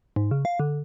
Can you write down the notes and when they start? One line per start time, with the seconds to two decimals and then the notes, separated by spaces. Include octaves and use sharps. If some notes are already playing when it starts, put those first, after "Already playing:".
0.16 G#2
0.31 C#3
0.45 F5
0.60 D3